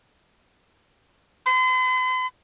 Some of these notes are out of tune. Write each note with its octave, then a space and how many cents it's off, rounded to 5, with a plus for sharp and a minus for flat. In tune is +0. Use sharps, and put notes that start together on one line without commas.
C6 -45